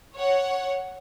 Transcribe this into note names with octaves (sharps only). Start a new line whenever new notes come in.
C#5 F#5